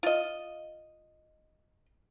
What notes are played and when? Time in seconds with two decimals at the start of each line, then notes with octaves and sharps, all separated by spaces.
0.03 F4 D#5